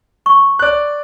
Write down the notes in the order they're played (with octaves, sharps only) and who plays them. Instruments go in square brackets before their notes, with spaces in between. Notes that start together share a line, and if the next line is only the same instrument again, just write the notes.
[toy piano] C#6
[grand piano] D5 F#6